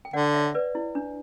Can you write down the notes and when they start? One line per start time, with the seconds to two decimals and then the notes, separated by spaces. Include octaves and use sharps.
0.05 G5
0.13 D3 D5 F#5
0.34 C#5 E5
0.54 B4 D5
0.75 E4
0.95 D4